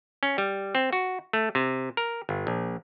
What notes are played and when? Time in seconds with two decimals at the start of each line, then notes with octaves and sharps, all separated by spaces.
0.23 C#4
0.38 G3
0.75 C4
0.93 F#4
1.33 A3
1.55 C3
1.97 A#4
2.29 G1
2.47 A#1